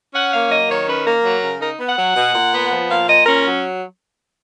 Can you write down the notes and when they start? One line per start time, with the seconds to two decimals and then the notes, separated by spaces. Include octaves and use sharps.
0.13 C#4 F#5
0.32 A#3 F5
0.50 F#3 D#5
0.69 D#3 C#5
0.87 C#4 B4
1.05 A#3 A#4
1.25 F#3
1.42 C#3
1.60 D#4 A#4
1.79 B3
1.88 F#5
1.97 F#3
2.15 B2
2.35 A#2
2.53 B3
2.70 F3
2.89 A#2 F5
3.07 A#2 D#5
3.26 C#4 A#4
3.45 F#3